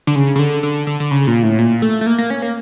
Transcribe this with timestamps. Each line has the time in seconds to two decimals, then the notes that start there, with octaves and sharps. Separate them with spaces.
0.07 D3
0.15 C#3
0.36 C#3
0.39 D3
0.63 D3
0.87 D3
1.00 D3
1.11 C#3
1.27 A#2
1.43 A2
1.59 A#2
1.82 A3
2.01 A3
2.06 A#3
2.18 A#3
2.30 C#4
2.42 A#3